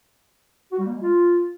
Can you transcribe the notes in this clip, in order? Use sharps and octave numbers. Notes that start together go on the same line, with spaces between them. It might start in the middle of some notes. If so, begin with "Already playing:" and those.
F#4
G3
A#3
G#3
F4